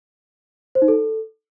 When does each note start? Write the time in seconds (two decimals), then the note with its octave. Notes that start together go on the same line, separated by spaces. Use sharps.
0.75 C5
0.82 D#4
0.88 A4